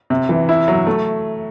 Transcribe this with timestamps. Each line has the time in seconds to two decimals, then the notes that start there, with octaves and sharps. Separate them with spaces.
0.10 C3
0.29 E3
0.49 E4
0.68 F#3
0.87 A3